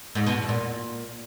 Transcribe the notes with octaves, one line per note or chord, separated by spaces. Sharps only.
G#2
B2
E2
A#2